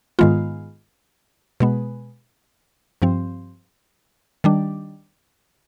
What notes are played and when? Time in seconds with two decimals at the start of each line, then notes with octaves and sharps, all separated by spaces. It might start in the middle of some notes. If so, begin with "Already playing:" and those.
0.19 G#2 D#3 G#3 B3 F4
1.60 B2 G#3 B3
3.02 G2 F3 C4
4.44 D#3 G3 D4